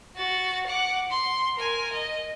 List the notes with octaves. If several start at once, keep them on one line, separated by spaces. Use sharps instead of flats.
F#4 A6
F#5 D6
C6
A#4 G#5
D#5